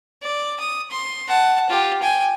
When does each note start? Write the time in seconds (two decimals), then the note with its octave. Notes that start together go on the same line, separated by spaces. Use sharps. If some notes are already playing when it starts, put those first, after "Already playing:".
0.23 D5
0.60 D#6
0.91 C6
1.28 F#5 A5
1.69 F4 G4
2.02 G5 G#5